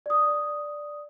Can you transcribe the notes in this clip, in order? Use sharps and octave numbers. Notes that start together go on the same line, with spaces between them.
D5 D#6